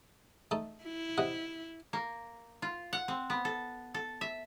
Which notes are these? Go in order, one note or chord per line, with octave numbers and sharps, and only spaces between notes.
A3 D#4 A4
E4
C3 D#5 F#5
A#3
F4
F#5
C4
B3
A4
A4
E5